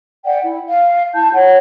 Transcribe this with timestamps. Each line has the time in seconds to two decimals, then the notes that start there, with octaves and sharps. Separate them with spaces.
0.25 D5 F#5 G5
0.42 E4
0.68 F5
1.14 E4 A5 G6
1.33 C#5 F#5